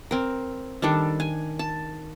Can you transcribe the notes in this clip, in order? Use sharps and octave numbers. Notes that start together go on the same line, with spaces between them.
C4 A#4
D#3 G3 D4 A4
G#5
A5